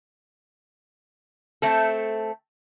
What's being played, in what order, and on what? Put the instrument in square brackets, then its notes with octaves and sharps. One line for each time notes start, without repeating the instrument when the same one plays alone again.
[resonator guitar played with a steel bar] A3 C4 A4